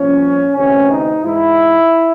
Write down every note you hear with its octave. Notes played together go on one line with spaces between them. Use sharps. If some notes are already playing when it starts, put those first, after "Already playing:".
Already playing: C2 A#2 F3 C#4
D2 C3 E3 C#4
D#4
G#2 E3 E4